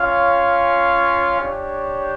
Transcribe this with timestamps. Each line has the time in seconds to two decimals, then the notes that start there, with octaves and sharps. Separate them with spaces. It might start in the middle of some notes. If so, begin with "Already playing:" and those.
Already playing: C#4 F4 C#5 F5
1.39 D4 G4 C#5